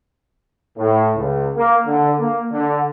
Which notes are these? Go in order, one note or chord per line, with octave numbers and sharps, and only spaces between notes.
A2
C#2
A#3
D3
A#3
D3